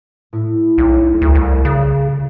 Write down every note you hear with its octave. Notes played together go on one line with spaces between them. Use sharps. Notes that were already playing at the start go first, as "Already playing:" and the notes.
A2 E4
B1
D2
C2
C#3